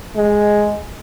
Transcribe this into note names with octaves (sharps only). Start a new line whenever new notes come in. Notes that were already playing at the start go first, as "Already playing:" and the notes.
G#3